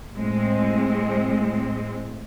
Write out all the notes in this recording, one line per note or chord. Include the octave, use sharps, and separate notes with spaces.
A2 G#3 C4